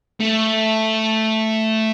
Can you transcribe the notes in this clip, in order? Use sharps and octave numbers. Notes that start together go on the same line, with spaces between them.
A3